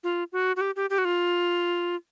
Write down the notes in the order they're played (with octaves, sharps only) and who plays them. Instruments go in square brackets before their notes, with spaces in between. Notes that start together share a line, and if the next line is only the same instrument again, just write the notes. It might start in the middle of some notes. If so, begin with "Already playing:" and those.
[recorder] F4
F#4
F#4
G4
G4
G4
F#4
F4